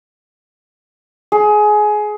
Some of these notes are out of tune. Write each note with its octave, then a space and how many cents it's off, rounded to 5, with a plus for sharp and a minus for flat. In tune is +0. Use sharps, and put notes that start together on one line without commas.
G#4 +20